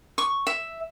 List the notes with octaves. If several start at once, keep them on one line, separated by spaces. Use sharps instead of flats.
C#6
E5